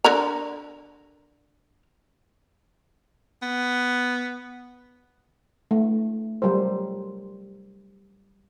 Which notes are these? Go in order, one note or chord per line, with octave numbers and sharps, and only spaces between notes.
D3 A#4 A#5
B3
A3
F#3 G3 A#4 C5